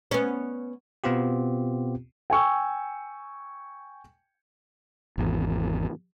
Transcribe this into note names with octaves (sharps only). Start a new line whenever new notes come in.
B3 C#4
B2 B3 C4 F4 G4
G5 G#5 C#6 E6
G#1 E2